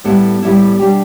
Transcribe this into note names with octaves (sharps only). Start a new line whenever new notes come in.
A2 G3 B3 E4 A4
A2 G3 B3 E4
B2 G3 D4 G4